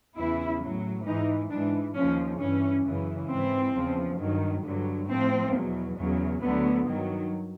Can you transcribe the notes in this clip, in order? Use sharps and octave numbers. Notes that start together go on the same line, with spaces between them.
E2 C#3 E3 E4
A2 F#3
G#2 E3 D#4
G#2 E3 D4
D#2 C#3 F3 C#4
G2 E3 C#4
F#2 C#3 E3
G#2 E3 C4
E2 C#3 F3
G2 D#3 F#3
G2 D3 F#3
A2 F3 C4
E2 B2 F#3
E2 C#3 F#3
D2 D3 F#3 B3
G2 D#3 F#3